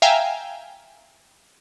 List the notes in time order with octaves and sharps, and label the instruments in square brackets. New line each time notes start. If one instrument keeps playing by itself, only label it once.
[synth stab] E5 F5 G5 G#5 A#5